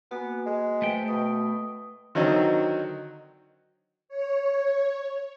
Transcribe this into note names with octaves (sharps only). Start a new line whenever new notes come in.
A#3 B3 F#4 G#5
G#3
A3 B4 C5 G5
B2 D#6
D3 D#3 F#3 C4 D#4
C#5